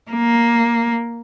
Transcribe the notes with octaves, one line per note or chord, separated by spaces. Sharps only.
A#3